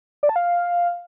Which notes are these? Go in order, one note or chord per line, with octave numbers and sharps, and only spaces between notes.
D5
A5
F5